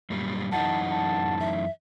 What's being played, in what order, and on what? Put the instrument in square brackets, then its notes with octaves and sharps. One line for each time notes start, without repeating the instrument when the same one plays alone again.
[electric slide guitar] F#2 A#2 G3
[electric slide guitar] F#2 E3 D#4 [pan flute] F#5 [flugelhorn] A5
[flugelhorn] A5
[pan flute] E5